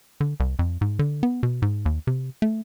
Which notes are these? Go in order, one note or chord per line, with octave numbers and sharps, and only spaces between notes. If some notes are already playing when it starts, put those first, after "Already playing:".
D3
C2
F2
G#2
D3
B3
B2
G#2
D#2
C3
A3